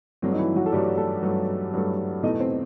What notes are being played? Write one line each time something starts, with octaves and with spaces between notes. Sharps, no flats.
G2 F#3 A3 C4
D#4
E3 E4
F#3 F#4
A4
G2 F#3 G3 A3 G4
A3 A4
G2 F#3 A3
G2 F#3 A3
E2 B2 A3 D#4 D#5
C4 C5